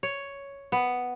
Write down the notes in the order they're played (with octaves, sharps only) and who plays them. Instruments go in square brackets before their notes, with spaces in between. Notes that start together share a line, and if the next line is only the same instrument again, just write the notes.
[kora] C#5
B3